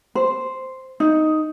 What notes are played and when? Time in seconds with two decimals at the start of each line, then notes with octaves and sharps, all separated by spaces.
0.15 C5
1.00 D#4